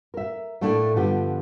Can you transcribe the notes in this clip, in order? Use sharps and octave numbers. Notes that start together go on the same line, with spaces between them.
A#4 E5
A2 A3 A#3 D4
G2 D3 F3 B3 G4